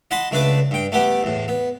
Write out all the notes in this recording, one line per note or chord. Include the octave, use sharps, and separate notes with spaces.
D#5 F#5 A5 B5 C6
C#2 A3 D4 B4 A5
G2 G5
A3 B3 G4 F#5
E2 A2
B3